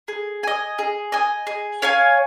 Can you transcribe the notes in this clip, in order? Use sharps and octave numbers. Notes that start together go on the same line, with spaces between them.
G#4
D#5 G#5
G#4
D#5 G#5
G#4
C#5 F5 G#5